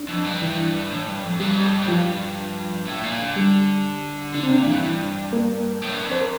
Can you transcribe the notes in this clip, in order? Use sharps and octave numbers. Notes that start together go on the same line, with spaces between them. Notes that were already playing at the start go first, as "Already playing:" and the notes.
Already playing: D4
F2
G2
E3 E4
A2
G2
F2
G2 G3 G4
F2
G2
A2
G2 F3 F4
A2
A#2
D3
G3 G4
D3 D4
C4
C3 D4
A#2
G2 E3 E4
G2
A#3 A#4
A2
G2
F2
C5
A#4